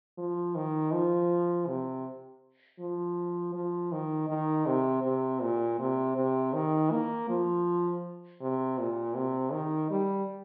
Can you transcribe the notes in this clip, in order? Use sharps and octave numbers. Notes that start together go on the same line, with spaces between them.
F3
D#3
F3
C3
F3
F3
D#3
D#3
C3
C3
A#2
C3
C3
D#3
A#3
F3
C3
A#2
C3
D#3
G3